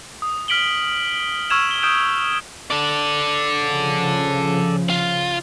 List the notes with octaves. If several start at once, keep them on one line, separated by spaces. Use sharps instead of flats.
D#6
F6 B6 D7 F#7 G7
C#6 E6 F6 G#6 E7 F7
G7
D#6 F6 G6 D7 E7
A4 D5
C#3 F3
F4